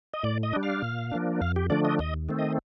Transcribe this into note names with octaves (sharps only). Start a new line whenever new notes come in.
D#5
A2 D5
D#5
G3 D4
F5
A#2
F3 A#3 D4
F2 F5
G4
D3 F3 A3 D4 D5
D#5
D#2 D#5
D#3 A3 C4
D#5